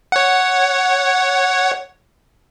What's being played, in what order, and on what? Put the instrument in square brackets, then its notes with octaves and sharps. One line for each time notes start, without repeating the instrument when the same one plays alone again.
[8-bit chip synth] C#5 F#5